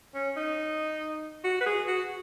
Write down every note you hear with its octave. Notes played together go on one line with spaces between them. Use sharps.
C#4
D#4
F#4
B4
G#4
F#4